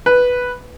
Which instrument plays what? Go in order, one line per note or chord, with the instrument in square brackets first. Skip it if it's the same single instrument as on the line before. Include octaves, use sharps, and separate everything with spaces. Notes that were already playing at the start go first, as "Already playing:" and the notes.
[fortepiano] B4